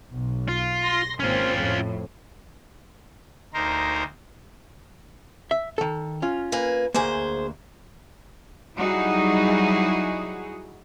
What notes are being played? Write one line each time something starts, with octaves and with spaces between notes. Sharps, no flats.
B1
F4
C6 A#6
G#1 A#3 C4 C#4 F4
F2 A2
D2 D#4 A#4 C5
E5
D#3 A4
C#4 F4
A#3 B4 G#5
D2 A#3 G#4 C5
F#3 G3 D#4 E4 F#4 G#4